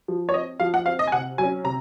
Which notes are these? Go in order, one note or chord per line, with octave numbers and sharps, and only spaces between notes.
F3
C#5
C4 D#5
F3 F5
F#5
C4 F5
D#5
G#5
C3 F#5
F#3 C#4 G#5
C3 A#5